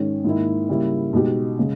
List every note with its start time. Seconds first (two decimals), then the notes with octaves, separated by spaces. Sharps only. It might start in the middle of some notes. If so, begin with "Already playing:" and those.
Already playing: G#2 D#3 G#3 C#4
0.24 G#2 D#3 A#3 E4
0.69 C#3 G3 A#3 E4
1.13 B2 G#3 D#4 G4
1.59 C#3 G#3